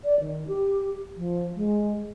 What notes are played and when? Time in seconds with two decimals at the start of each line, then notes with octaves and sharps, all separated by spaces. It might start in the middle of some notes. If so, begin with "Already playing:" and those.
0.04 D5
0.20 D#3
0.48 G4
1.16 F3
1.56 G#3